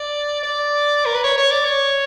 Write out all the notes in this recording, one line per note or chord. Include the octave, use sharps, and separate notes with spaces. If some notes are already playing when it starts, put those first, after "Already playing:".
Already playing: D5
D5
A#4
B4
C#5
C#5
D5
C#5